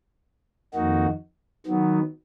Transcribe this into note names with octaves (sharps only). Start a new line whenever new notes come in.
F2 D#3 A#3 D#4 F#4
D#3 F#3 B3